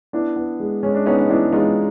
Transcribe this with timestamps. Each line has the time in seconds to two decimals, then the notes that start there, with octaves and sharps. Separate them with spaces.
0.13 B3 D4 E4
0.36 B3
0.60 G#3
0.83 G#3 C#4
0.95 D4
1.06 B3 C#4 D#4
1.18 D#4
1.30 B3 D4 E4
1.53 G#3 D#4 F4